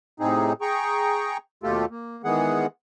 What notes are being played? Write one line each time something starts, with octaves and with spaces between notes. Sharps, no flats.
A2 C3 C4 D#4 G#4
G#4 G5 A#5 C#6
D#2 B2 A3 F4 G4 A4
A#3
D#3 E3 G#3 B3 G#4 F#5